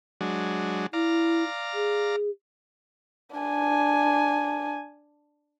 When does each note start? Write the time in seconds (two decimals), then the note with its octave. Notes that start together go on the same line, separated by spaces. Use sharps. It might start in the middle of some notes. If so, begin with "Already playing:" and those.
0.21 F#3 G#3 D4
0.93 E4 D5 F5 A#5
1.74 G#4
3.36 D4 G#5